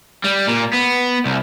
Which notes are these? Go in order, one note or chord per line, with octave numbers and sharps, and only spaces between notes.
G3
A#2
B3
C2